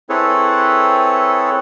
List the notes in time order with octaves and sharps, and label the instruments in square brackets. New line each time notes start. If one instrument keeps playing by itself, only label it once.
[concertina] C4 E4 G#4 A4 B4 C#5